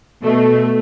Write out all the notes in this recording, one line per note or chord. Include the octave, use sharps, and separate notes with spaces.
B2 A3